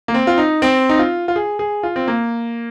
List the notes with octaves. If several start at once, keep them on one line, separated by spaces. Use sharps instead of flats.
A#3
C4
F4
D#4
C4
D#4
F4
F4
G#4
G#4
F4
C4
A#3